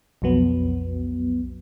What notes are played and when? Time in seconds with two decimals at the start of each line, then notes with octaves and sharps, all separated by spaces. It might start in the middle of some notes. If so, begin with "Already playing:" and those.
0.22 B1 F2 F#3 B3